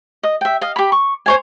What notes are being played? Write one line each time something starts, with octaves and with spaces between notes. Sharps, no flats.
D#5
E5 G5
D#5 F5
G4 B5
C#6
C5 C#5 G#5